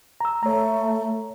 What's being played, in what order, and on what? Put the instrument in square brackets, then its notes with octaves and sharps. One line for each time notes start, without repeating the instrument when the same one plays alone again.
[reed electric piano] A#5 E6
[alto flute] A3 [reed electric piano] C#5 A#5